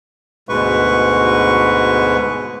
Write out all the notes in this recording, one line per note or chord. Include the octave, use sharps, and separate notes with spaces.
D2 G#2 B2 G#3 B4 C#6